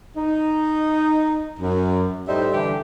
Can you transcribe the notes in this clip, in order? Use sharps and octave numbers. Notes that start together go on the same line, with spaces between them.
D#4
F#2
A2 G3 D#4 C5 E5
D3 E3 G3 D4 G4